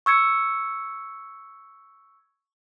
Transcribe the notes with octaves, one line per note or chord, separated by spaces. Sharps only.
C#6 E6 G#6 C#7